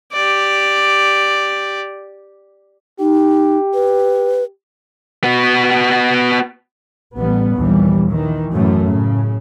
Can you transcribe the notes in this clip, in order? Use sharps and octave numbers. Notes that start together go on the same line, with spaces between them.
G4 D5
D#4 G4
B4
B3 F#4
A1 G3 B3
A#1 D#2 E3 G3
D#3 E3
F#2 A2 E3 A3
A2 C#3